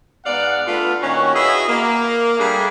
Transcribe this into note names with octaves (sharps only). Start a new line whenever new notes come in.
G#2 B3 D5 F5 F#5
A3 D4 F4 A4 B4
A#2 D#3 C#4 F#4
E4 F#4 G#4 B4 D#5 E5
A#3
G3 A3 D4 G#4